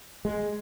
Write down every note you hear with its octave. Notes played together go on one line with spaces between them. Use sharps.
G#3